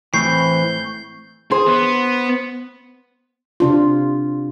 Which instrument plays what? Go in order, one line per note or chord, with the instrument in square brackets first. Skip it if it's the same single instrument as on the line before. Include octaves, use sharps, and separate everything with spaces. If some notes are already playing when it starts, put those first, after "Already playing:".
[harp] A2 [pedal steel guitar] E3 C4 [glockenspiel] C#6 C7 [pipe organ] G6
[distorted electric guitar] G#4 [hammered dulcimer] C5
[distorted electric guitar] B3
[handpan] C3 D4 F4